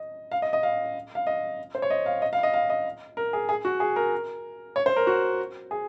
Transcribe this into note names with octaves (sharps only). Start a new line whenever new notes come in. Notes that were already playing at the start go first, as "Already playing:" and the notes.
Already playing: D#5
F5
D#5
D#5
F5
F5
D#5
C5
C#5
D#5
F5
D#5
F5
D#5
F5
D#5
A#4
G#4
G#4
F#4
G#4
A#4
C#5
C5
A#4
F#4
G#4